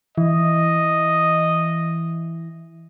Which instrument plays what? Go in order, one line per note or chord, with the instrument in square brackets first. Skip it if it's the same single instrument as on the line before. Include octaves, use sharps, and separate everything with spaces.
[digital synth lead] E3 [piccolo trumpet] D#5